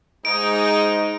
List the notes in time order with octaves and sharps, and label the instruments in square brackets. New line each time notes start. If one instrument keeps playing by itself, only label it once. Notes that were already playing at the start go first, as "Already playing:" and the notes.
[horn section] G#2 D#4 [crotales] D7